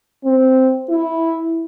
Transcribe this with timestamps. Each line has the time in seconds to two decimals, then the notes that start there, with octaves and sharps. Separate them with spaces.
0.24 C4
0.89 E4